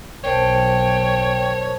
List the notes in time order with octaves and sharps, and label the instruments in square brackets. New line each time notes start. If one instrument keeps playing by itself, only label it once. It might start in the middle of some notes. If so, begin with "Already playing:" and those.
[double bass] B1 [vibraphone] A#4 C5 A5 [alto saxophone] C#5 [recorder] G5